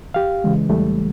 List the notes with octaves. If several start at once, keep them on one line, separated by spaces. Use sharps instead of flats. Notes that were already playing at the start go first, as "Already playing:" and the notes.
G4 F5
C#3 E3 G#3
E2 G3 A3